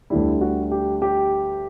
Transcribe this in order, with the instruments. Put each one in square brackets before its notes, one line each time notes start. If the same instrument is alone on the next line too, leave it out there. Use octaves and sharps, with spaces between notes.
[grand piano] D2 D3 G3 E4
F#4
G4
G4